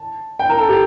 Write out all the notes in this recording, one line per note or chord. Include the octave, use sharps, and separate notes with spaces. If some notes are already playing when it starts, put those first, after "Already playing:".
Already playing: A5
G5
A#4
A4
G4